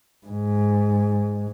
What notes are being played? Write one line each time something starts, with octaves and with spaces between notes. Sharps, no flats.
G#2